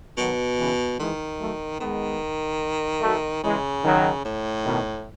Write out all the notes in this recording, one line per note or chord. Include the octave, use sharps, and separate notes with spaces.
B2 D#3 F#3
C#3 E3
D#3 E3 G#3
F#3 A3
D#3 G#3 B3
F#3 A3
C#3 E3 G#3
D#3 F#3
A2
B2 D#3